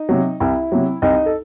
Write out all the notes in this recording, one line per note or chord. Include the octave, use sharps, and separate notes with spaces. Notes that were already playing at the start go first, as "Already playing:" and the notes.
Already playing: D#4 D#5
C3 F#3
C2 E4 E5
C3 F#3
C2 D#4 D#5
A4